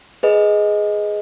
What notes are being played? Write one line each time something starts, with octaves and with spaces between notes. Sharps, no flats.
G#4 B4 D#5